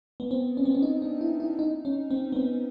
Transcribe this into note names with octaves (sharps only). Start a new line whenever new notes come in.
B3
C4
C#4
C4
C#4
D#4
D4
E4
E4
D#4
C#4
C4
B3
C4